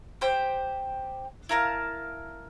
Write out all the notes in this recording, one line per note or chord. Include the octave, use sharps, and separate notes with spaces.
G4 C5 G5
E4 A#4 F5 A5